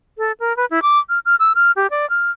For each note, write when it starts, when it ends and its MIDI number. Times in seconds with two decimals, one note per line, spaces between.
0.18 0.32 69
0.40 0.55 70
0.57 0.65 71
0.71 0.80 64
0.82 0.99 86
1.09 1.19 89
1.26 1.36 89
1.40 1.53 88
1.55 1.72 89
1.76 1.90 67
1.91 2.09 74
2.10 2.31 89